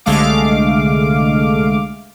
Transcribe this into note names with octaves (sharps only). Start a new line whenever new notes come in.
C2 D3 G#3 A3 F5 D6